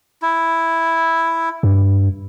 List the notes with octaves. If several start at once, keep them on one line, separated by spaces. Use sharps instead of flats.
E4
G2